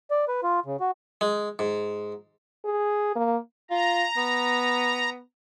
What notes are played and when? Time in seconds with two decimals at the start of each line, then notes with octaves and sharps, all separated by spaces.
0.11 D5
0.28 B4
0.43 F4
0.66 C#3
0.80 F#4
1.21 G#3
1.59 G#2
2.65 G#4
3.16 A#3
3.71 F4 A#5
4.17 B3